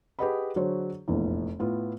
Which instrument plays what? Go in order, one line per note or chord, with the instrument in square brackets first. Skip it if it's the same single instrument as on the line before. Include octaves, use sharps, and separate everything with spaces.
[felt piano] G4 G#4 B4 D#5 F#5 B5
D3 F#3 F#4 G#4 C5 C#5
F1 A#1 E2
A2 B3 F4